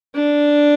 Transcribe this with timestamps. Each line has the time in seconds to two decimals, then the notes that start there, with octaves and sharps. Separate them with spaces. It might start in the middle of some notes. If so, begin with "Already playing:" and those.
0.15 D4